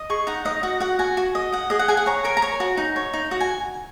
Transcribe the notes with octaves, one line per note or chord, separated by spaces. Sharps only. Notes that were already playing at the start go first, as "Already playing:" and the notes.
Already playing: D#5
G#4 C#6
D#4 F#5
D#4 D#5
F#4 F#5
F#4 F#5
F#4 G#5
F#4
D#5
D#5 F#5
G#4 D#5
F#5
G#4 G#5
F#5
C#5 A#5
A#4 G#5
A#5
C#5 G#5
F#4
D#4
C#5
D#4
F#4
G#5